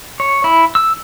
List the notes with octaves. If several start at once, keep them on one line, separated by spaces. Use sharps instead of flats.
C#5
E4
E6